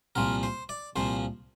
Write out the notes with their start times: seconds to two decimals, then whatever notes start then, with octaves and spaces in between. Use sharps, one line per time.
0.15 C2 A#2 F3 A#4
0.43 C5
0.69 D5
0.96 C2 A#2 F3 C5